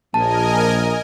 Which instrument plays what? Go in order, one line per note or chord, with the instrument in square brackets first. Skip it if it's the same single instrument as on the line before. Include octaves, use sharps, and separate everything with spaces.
[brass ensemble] A#1 [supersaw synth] A#4 D#5 G#5 [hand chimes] A5